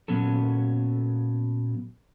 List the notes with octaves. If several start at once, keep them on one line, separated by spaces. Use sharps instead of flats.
A#2 F#3 B3 C#4 A4